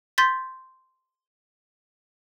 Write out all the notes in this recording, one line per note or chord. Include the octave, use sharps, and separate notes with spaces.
C6 G6 A6 B6